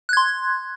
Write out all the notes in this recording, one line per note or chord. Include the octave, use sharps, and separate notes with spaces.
C6 F#6 G#6